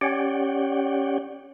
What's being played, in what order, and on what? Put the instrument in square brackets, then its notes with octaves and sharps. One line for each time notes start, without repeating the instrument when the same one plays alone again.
[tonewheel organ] C#4 G4 C#5 D5 F#5 G5